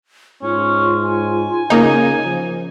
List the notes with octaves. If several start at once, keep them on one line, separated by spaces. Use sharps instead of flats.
G#2 C#4 F4
G#5
C#3 A#3 D#4
F3